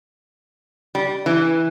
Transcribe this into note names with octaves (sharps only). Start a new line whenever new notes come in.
G3
E3